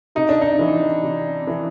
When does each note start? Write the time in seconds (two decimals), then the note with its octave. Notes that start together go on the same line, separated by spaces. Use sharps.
0.15 C3 D#4
0.29 D4
0.41 D#4
0.59 E3
1.03 C3
1.47 E3